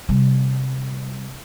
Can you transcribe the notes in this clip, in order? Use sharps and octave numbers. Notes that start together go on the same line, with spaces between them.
C3 G3